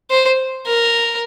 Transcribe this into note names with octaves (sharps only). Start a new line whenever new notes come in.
C5
A#4